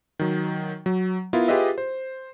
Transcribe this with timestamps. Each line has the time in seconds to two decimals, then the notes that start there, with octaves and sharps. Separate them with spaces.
0.19 D#3 F#3
0.86 F#3
1.33 B3 E4 F4 A#4
1.48 F4 G4 G#4 B4 D#5 E5
1.78 C5